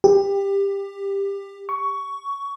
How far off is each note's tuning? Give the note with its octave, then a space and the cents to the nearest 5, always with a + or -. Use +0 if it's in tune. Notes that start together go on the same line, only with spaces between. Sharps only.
G4 +20
C#6 +15